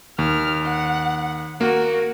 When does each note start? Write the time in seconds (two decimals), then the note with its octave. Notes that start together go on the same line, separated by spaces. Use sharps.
0.18 D#2 F6
0.64 F#5
1.61 A#3 F#4 A#4